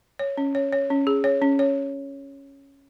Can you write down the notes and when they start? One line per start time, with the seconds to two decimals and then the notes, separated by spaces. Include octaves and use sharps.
0.19 C#5
0.37 C#4
0.55 C#5
0.73 C#5
0.90 C#4
1.07 G#4
1.24 C#5
1.42 C#4
1.59 C#5